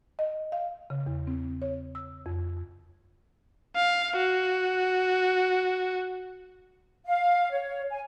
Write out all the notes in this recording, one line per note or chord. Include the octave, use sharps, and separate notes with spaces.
D#5
F5
C#3
E2
C4
C#5
E6
F2
F5
F#4
F5
C#5
G#5